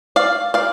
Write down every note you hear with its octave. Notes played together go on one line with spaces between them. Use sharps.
D5 F5
D5 F5